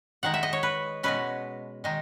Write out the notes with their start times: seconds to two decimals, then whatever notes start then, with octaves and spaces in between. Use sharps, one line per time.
0.23 D#3 G#3 D#4 F#5
0.34 E5
0.43 D#5
0.53 C#5
0.63 B4
1.03 B2 G#3 C#4 B4
1.84 D#3 G#3 D#4